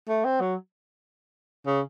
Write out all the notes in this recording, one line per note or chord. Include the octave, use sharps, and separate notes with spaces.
A3
C4
F#3
C#3